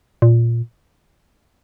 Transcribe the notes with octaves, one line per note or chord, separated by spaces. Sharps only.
A#2